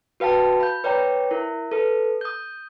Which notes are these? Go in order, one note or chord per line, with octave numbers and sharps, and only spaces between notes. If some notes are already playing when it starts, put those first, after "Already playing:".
F#4 B4 F5 G5 A5
B5 G6
B4 C#5 D5 G5 A#5
E4 A#4
A4 B4
D#6 G6